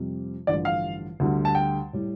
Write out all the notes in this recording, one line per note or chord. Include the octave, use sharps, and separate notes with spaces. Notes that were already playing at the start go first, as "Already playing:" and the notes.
Already playing: F2 C3 G3
A1 G2 D3 F3 D5
F5
D2 D3 G3
A5
G5
A2 G3